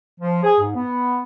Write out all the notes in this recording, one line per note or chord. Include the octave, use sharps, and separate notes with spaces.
F3
G#4
G#2
B3